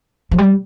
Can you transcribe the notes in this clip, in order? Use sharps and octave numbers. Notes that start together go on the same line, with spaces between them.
F3
G3